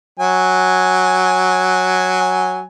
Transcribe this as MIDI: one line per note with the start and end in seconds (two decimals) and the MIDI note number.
0.19 2.62 54
0.19 2.62 80